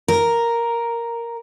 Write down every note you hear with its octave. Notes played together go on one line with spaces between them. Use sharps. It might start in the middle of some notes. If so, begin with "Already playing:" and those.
A#4